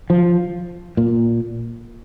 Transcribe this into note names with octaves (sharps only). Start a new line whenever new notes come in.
F3
A#2